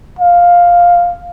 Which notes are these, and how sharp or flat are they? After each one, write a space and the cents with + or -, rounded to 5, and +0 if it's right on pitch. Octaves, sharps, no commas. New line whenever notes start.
F5 +5